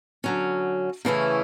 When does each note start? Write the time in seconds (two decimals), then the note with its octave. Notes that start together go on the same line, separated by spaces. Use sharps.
0.24 D3 F#3 C#4
1.05 C#3 E3 A3 C#4 E4